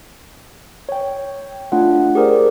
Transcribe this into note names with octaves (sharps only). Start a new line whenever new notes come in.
C#5 G5
A3 D4 F4 F#5
G4 G#4 A#4 C5 D5